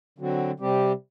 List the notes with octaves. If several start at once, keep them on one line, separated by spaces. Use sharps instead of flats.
D3 F#3 C4 F#4
C3 G3 C4 G4